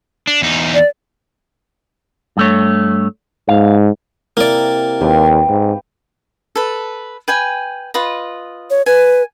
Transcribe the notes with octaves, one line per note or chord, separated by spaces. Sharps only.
D4
E2 D#4
D5
G2 A3 C#5
G#2 F5
C3 A#3 E4 D5 A#5
D#2 G4 B4 F5
G#2
A4 B4
B4 G5 G#5
F4 B4 D#5
C#5
B4 G#5